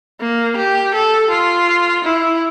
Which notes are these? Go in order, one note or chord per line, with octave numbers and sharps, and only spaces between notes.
A#3
G4
A4
F4
E4